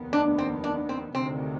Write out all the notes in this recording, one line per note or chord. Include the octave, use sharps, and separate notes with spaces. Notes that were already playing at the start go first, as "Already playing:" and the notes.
Already playing: F1 D#2 D#3 B3
D4
C4
D4
C4
D2 C3 D#3 C4